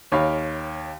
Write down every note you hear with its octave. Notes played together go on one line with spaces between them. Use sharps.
D#2 C#5 F5 B5